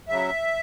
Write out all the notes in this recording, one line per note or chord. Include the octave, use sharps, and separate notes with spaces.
C#3 F#3 E5